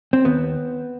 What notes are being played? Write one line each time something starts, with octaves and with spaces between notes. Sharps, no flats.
C4
D#2 B3